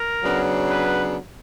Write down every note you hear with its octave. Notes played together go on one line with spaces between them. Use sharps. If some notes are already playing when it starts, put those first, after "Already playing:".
Already playing: A#4
C#3 F#3 B3 D4
B4